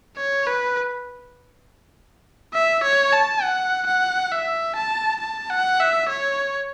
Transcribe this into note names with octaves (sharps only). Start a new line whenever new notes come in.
C#5
B4
E5
C#5
A5
F#5
F#5
E5
A5
A5
F#5
E5
C#5